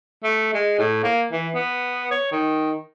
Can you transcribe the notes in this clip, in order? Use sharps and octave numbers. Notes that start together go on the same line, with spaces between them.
A3
G#3
A2
A#3
E3
B3
C#5
D#3